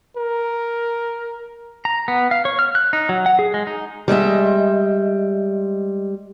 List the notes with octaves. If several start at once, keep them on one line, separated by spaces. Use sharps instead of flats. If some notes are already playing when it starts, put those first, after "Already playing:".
A#4
A#5
B3
F5
C#5
F6
F#6
D#4
F#3
F#5
G#4
G#3
D#4
G3 G#3 D#5 E5